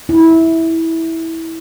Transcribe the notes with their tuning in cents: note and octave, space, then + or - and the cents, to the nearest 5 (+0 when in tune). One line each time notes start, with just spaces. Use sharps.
E4 -15